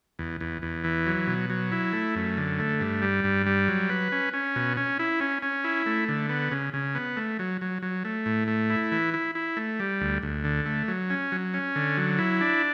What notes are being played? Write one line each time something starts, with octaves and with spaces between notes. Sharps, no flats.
E2
E2
E2
E3
F#3
B2
F#3
E4
A3
F#2
D3
A3
G2
G3
G2
G3
F#3
B4
C#4
C#4
B2
C#4
E4
C#4
C#4
E4
A3
D3
B3
C#3
C#3
B3
A3
F#3
F#3
F#3
A3
A2
A3
E4
E3
E4
E4
A3
G3
D2
D2
D3
A3
F#3
C#4
F#3
C#4
D3
F#3
E4
D4